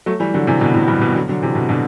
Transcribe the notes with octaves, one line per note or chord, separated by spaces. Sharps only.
F#3 A3
E3 G3
D3 F#3
C3 E3
B2 D3
A2 C3
G2 B2
G2 B2
D3 F#3
D3 F#3
C3 E3
B2 D3
B2 D3